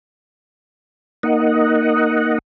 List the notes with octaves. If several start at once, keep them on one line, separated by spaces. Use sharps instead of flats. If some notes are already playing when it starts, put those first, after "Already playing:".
A#3 D#4 D#5 F#5